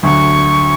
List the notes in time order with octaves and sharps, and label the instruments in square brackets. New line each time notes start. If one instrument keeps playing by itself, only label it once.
[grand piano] D2 D3 F#3 [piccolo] C#6